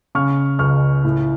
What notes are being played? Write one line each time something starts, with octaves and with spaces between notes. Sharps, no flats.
C#3 C#6 F6
C#2 C#6 F6
A2